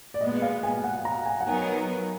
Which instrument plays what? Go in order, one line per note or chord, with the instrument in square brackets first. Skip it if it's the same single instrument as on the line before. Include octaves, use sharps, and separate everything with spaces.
[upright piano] D5
[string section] A#2 G#3 B3 [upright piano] D#5
[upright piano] F5
G#5
F#5
A#5
G#5
F#5
[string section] F#3 B3 D#4 A#4 [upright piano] G#5